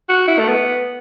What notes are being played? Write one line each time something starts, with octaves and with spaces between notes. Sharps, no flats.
F#4
E4
A3
B3